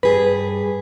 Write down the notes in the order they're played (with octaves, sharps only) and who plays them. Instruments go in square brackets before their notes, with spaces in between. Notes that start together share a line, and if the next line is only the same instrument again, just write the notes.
[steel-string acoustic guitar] G2 G#4 [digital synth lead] B4